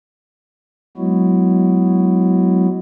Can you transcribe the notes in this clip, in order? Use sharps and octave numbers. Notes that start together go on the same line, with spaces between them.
F#3 G#3 B3 E4 F#4